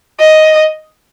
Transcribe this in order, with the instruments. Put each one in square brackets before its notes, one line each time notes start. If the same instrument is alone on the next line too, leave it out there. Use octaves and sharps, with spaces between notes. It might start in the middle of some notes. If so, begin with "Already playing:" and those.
[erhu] D#5